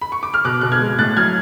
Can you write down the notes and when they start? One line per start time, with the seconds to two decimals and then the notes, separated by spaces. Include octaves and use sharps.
0.01 B5
0.12 C#6
0.23 D6
0.34 F6
0.45 B2 D6 F#6
0.61 B2 F#6
0.72 F6 G#6
0.80 G#3
0.99 A2 F#6 A6
1.17 F#3 F6 G#6